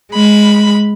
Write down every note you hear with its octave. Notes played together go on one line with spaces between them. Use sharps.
G#3 B5